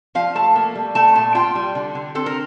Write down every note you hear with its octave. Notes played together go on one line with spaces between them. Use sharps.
F3 F5
A3 A5
A#3
G3
A3 A5
A#2 A5
F4 G5
G3
D3
D3
C4 A4
A#4